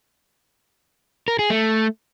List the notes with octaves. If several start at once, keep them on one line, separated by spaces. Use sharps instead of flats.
A#4
G#4
A3